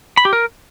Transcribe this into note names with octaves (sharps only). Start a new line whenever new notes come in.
B5
G4
A#4